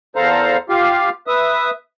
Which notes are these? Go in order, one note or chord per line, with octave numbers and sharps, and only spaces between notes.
E2 A4 C5 F5 A#5
F4 G4 F5
B4 E5 D#6